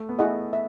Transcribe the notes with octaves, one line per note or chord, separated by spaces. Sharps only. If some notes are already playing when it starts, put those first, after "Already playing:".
Already playing: A3
B3
A3 E4 G#4 D#5 F#5
E5